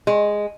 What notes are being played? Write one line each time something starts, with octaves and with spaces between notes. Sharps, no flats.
G#3